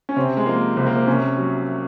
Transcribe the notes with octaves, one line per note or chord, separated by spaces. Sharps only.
C#4
C3 C4
G#3
F3 A#3
C2 C4
A#3
C4
C3 C#4
F#3